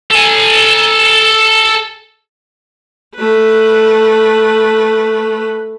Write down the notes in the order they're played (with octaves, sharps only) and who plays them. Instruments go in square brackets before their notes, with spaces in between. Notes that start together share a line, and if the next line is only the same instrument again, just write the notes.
[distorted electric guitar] A4 G#5
[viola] A3 B4